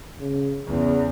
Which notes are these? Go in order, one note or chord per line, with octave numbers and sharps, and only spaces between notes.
C#3
E2 C#3